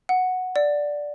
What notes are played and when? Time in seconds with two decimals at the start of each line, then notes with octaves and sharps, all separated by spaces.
0.09 F#5
0.56 D5